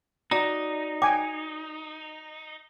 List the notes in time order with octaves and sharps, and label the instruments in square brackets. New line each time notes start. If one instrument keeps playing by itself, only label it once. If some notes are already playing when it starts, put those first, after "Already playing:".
[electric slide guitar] D#4 [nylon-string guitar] F#4 D5 [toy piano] A#5
[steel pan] G5 G#5 [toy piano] D6